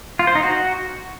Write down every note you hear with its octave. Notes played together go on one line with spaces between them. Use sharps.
F4
C5
D#4
F#4